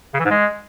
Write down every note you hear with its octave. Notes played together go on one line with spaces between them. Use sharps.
C#3
E3
G#2
G#3